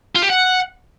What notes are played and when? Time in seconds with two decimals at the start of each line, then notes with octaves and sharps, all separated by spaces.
0.16 F4
0.23 G4
0.30 F#5